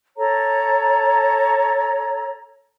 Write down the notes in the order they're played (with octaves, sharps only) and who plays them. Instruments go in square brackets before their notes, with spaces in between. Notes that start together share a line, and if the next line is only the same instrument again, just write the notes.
[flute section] A4 C#5 A#5